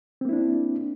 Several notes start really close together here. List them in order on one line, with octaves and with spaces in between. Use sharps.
C4 A#3 E4 D4